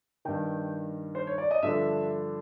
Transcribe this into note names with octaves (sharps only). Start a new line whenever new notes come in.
G2 D#3 G5
C5
C#5
D5
D#5
G2 D3 F3 E5